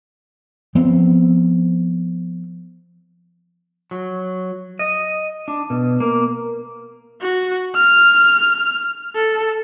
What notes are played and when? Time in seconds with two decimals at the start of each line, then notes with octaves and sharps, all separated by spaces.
0.75 F3 B3 C4
3.91 F#3
4.79 D#5
5.48 D4
5.70 B2
6.00 A#3
7.21 F#4
7.75 F6
9.16 A4